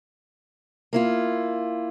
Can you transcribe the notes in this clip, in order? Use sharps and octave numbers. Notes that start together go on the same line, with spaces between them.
A#3 E4 F4